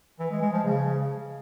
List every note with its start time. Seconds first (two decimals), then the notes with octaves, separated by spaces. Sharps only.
0.19 E3
0.31 G#3
0.42 G#3
0.53 F3
0.64 C#3